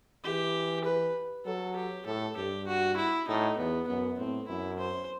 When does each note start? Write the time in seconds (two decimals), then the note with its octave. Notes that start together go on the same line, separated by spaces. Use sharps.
0.24 E3 G4
0.85 B4
1.46 F#3 A4
1.76 G4
2.06 A2 A4
2.37 G2 G4
2.68 F#4
2.97 E4
3.28 A2 D#4
3.58 E2 B3
3.88 F#2 B3
4.18 A2 C4
4.48 F#2 E4
4.80 C5